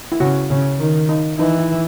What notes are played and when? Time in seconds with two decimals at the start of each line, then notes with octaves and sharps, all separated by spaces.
0.12 E4
0.20 C#3 F#4
0.50 C#3
0.79 D#3
1.09 D#4
1.39 E3 D#4
1.58 E4